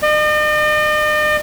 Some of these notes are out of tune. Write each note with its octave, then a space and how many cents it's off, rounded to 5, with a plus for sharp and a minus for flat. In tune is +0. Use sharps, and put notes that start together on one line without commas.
D#5 -45